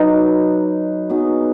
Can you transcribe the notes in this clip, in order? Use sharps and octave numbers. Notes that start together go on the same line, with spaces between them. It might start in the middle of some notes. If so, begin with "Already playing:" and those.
Already playing: F#3 D#4 B4
F#3 B3 D#4 G#4